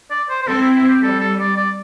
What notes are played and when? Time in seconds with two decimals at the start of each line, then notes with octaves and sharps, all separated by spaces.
0.10 D5
0.30 C5
0.42 C5
0.47 C4 A4
0.61 E4
0.76 E4
0.89 G4
1.02 G3 A4
1.20 A4
1.40 D5
1.57 D5